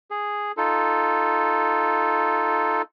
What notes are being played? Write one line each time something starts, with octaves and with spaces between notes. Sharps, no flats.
G#4
D#4 F4 A4